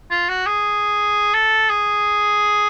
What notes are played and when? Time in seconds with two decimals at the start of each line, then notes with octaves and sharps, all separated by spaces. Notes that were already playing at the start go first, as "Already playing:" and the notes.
0.11 F4
0.29 F#4
0.46 G#4
1.34 A4
1.69 G#4